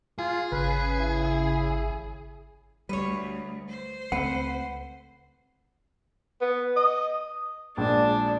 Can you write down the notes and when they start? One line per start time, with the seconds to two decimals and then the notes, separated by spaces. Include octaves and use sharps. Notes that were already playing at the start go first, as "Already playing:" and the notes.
0.19 F4 G#4
0.52 G#1 C#3 B4
0.99 E4
2.89 D2 G3 B4 C#5
3.68 C5
4.12 C#2 A3 C4 B4 F#5
6.41 B3
6.76 D#5
7.78 A#1 G#3 D4